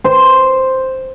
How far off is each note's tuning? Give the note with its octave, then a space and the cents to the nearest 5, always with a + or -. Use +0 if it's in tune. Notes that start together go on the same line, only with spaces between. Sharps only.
C5 +0